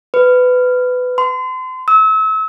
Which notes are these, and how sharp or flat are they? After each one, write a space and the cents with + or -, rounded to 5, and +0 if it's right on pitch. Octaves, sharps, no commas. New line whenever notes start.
B4 +20
C6 -35
E6 -35